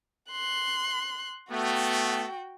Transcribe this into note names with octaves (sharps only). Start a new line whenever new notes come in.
C6 F#6
A3 B3 F#4 G5